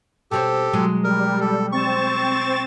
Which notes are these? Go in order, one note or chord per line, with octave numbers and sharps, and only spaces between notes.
B2 C4 G4 A4 C#5
B2 F#3 G#3
G3 A#4
A4
C4 C#6 A6 E7